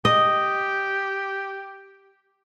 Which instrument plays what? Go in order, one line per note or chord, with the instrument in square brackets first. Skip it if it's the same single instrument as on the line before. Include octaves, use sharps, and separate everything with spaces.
[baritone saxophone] G4 [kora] D#5